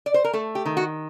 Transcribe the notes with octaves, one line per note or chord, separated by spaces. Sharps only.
D5
C5
A#4
A3 A4
G4
D#3
F#4